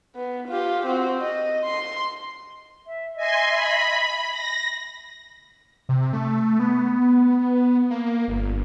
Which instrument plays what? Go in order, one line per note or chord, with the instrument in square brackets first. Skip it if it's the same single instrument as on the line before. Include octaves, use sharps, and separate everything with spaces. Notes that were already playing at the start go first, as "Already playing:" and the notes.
[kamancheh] B3
F4 G4
C4 F#4
D#5
C6
[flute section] E5
[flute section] D#5 E5 [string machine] G#5 C6
[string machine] B5
A#6
[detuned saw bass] C3
A3
B3
A#3
G1